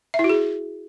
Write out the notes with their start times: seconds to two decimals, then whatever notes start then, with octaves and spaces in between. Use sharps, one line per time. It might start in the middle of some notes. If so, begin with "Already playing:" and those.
0.14 E5
0.19 E4
0.24 F#4
0.29 G#4